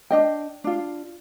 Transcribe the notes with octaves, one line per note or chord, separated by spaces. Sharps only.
D4 D#5 G5
D4 F4